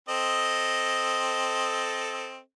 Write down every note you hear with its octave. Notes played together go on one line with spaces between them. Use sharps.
C4 A4 D#5